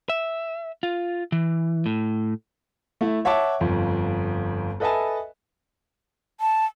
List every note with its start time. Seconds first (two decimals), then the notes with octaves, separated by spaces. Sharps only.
0.09 E5
0.83 F4
1.32 E3
1.86 A2
3.01 A3 E4
3.25 C#5 E5 F#5 A5 D6
3.60 G1 F2
4.80 A4 B4 D#5 E5 G#5 A5
6.40 A5